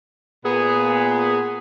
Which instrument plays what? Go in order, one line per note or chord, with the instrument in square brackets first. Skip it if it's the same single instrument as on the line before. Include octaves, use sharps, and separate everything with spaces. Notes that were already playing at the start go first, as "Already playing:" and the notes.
[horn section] A#2 B3 [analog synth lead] G#4